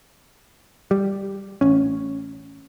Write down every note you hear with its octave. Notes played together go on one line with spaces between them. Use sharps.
G3
A1 C#4